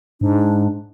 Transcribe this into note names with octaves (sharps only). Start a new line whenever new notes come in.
G#2 D4